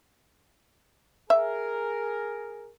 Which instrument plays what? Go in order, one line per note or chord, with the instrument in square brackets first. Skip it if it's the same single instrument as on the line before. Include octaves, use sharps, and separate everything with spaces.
[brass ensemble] G#4 A#4 [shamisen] E5